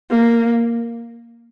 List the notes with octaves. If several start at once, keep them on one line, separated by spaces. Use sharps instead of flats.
A#3